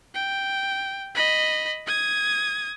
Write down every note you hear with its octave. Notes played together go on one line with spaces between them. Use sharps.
G5
D#5 B5
D#6 G#6